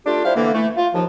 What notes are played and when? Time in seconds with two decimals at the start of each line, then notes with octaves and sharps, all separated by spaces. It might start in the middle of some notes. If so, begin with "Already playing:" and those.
0.06 A3 D4 F4 G4
0.25 G3 E4 C5 F5
0.36 D3 E3 A#3
0.54 E3 A3
0.77 F4
0.94 D#2 F3